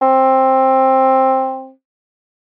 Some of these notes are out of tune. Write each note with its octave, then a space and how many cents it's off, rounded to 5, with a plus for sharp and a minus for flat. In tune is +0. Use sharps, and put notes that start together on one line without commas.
C4 +15